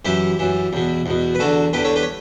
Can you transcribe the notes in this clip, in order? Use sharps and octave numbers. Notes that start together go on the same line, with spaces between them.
F#2 E3 E4 G4
F#2 E3
E2 B2
E2 B2
B4
E2 D3 F#4 A4
E2 D3 G4 B4
A4 C#5
G4 B4
C#5